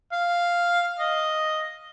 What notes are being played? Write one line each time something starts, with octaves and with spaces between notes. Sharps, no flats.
F5
D#5